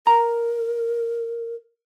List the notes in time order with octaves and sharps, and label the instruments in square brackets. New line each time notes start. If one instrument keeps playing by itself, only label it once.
[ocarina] A#4 [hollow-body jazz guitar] A#5